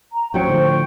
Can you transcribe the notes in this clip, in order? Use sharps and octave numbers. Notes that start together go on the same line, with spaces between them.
A#5
A1 F#3 C#4 C5 G5 C#6
A2 D3 F3